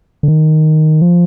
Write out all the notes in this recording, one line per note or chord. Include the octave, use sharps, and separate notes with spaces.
D3
D#3
F3